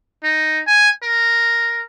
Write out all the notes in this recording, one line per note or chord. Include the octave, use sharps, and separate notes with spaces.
D#4
G#5
A#4